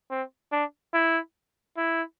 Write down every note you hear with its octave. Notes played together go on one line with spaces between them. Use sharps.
C4
D4
E4
E4